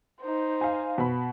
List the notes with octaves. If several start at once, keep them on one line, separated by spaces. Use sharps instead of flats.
D#4 C5
F5 G#5
B2 B5